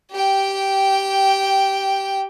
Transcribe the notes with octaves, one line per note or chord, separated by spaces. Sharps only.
G4 G5